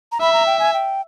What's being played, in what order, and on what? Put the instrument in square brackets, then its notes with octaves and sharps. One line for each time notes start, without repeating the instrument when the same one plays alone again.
[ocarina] A#5
[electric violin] E5 [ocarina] B5
[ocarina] A#5
G5
G#5
G5